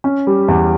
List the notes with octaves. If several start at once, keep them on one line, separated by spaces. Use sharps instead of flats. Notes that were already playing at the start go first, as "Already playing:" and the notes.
C#4
G3
E2